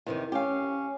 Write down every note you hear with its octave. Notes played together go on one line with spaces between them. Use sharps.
E2 C3 D#3
C#4 G4 F5